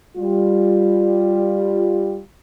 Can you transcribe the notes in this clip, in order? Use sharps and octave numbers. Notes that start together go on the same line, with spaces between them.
G3 F4